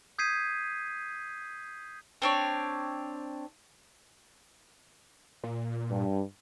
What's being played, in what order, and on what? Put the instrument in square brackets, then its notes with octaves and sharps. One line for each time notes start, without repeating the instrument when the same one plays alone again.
[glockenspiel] D#6 G6 G#6 B6 C7 D#7
[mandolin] C4 D4 C#5
[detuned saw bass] A#2
[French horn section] G2